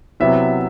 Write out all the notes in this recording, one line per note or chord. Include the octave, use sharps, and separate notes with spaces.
C3 F#3 B3 E4 E5